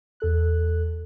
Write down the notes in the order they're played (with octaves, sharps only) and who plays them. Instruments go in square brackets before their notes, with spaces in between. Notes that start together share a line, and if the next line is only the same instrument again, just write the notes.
[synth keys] E2 A4 F#6